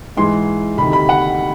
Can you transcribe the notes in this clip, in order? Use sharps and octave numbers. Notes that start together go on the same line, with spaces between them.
G#2 E3 G#3 C6
D2 C3 D#3 B5
B5
F#5